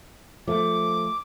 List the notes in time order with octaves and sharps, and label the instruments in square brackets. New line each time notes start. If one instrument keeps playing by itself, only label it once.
[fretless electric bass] F3 A3 [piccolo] D6